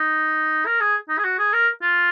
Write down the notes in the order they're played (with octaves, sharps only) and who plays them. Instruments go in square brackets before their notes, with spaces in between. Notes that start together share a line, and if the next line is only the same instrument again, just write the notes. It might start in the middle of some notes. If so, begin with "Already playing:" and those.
Already playing: [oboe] D#4
A#4
G#4
D#4
G#4
F#4
G#4
A#4
F4